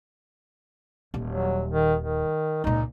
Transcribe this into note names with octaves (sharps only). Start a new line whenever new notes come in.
D#1
F#3
D#3
D#3
C#2 A#2 D#4